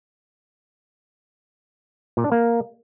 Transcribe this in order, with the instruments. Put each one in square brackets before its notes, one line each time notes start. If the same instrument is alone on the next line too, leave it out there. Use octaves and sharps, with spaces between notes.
[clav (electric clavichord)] A#2
D4
A#3